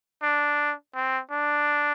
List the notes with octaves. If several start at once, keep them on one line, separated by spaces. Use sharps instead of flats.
D4
C4
D4